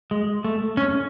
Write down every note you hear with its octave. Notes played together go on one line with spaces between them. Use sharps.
G#3
A3
C#4